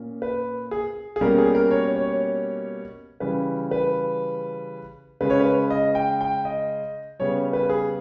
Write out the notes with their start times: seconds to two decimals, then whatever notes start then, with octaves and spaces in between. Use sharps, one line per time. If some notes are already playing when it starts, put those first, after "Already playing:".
Already playing: A#2 A#3 C#4
0.22 B4
0.71 G#4
1.16 G#4
1.21 B2 G3 A#3 C#4 A#4
1.38 G#4
1.55 A#4
1.71 C#5
1.96 C#5
3.20 C#3 E3 G3 C#4 B4
3.71 B4
5.21 C#3 G#3 C#4 B4
5.30 C#5
5.40 B4
5.70 D#5
5.95 G5
6.21 G5
6.45 D#5
7.20 C#3 G3 B3 C#5
7.53 B4
7.70 G#4